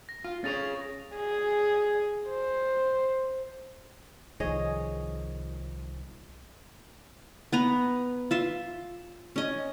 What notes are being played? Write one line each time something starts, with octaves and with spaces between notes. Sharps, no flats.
A#6
F4
C#4 G#4 C#5 A6 A#6 F7
G#4
C5
C2 D#3 F3 G#4 C#5 D#5
B3 B4 A#5
F4 E5 C6
C#4 D#5